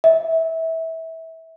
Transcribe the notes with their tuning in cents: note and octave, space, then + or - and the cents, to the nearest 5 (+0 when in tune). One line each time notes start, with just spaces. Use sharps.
E5 -25